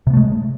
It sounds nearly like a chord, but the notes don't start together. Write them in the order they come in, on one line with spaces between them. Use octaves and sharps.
C3 B3 A3 G#3